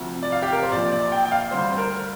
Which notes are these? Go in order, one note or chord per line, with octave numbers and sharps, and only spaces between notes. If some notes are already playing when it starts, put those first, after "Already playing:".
Already playing: D2 C3 F3
D5
F5
G4
A#4
C5
A#1 A#2 F3 D5
D5
G5
G5
F5
D2 D3 G3 C5
C5
A#4